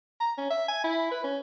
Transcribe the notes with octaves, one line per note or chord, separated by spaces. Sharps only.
A#5
C#4
E5
G#5
E4
B4
C#4